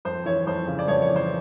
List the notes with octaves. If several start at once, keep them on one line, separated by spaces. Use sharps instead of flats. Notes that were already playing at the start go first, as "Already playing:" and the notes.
F2 C5
E3 C#5
F2 C5
C#3
D5
F2 C#5
C#5
E3
C5